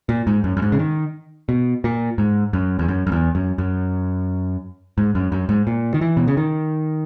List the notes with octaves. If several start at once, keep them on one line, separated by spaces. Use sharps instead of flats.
A#2
G#2
F#2
F#2
G#2
C#3
D#3
B2
A#2
G#2
F#2
E2
F#2
F#2
E2
F#2
F#2
G#2
F#2
F#2
G#2
A#2
D#3
E3
B2
C#3
D#3